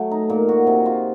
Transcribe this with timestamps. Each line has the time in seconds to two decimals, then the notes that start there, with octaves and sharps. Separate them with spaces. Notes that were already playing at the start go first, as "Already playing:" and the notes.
Already playing: F#3 A3 A4
0.11 D#4
0.30 A#2
0.49 F#4
0.67 C3
0.86 F4